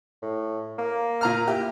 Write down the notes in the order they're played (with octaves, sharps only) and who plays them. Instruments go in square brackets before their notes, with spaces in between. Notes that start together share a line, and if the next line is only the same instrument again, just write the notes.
[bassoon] A2
A#3
[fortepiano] A#2 A#5 F6
[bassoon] E4 [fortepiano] G4